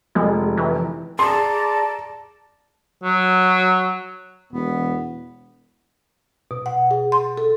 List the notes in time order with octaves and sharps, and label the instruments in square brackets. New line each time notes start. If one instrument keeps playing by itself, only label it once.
[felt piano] F1 [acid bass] G#3
[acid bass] E3
[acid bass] G#4 [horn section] D5 A#5 [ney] A5 [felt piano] C6
[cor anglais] F#3
[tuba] E1 [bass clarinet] B3
[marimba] B2
F#5
G#4
C6
A4